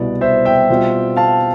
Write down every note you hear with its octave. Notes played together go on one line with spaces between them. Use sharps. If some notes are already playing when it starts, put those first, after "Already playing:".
Already playing: C2 B2 B3 E4 D5
C5 E5
E5 G5
B2 G3 C4 F4
F5 A5